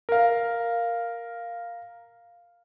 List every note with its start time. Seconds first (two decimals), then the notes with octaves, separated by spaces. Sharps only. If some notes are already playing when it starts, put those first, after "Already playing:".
0.09 A#4 F5